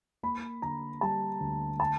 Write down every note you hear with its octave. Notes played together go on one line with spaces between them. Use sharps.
A#3 B5
D3 A#5
G3 A5
D2
A5